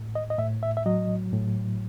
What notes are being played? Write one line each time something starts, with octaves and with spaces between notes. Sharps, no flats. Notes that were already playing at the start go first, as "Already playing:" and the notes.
Already playing: A2
D#5
D#5
A2 E5
E5
E5
F#3 D#5
A2